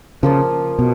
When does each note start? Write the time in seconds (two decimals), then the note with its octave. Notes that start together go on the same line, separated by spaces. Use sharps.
0.23 C#3 F3 A#3 F4
0.79 B2